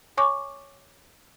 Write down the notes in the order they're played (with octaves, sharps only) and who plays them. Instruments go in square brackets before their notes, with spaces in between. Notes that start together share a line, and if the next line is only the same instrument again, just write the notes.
[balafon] C#5 G#5 C#6 D6